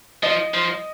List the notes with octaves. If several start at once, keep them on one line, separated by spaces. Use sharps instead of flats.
F3 D#5
F3